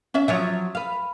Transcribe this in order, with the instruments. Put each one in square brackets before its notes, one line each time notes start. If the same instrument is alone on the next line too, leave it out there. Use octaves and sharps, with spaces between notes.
[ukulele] C#4 E5
[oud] F3 F#3 [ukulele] C#5 E5
[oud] B4 F5